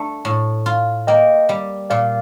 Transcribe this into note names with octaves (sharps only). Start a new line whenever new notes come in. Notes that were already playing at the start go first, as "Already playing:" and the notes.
Already playing: A3 D4
A2
F4
A#3 D#5 G5
G3
A#2 D5 F5